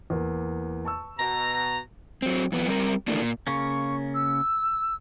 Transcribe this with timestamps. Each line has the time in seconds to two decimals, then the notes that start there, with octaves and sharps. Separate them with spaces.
0.10 E2 A#3
0.85 A5 C#6 E6
1.19 B2 A#5
2.22 F#3 C4
2.52 F2 B3
2.68 G3 C4 A#4
3.08 A2 D#3 E3 A3 A#3 D4
3.20 A#2
3.47 C#3 A#3 C#4 C#6
4.14 E6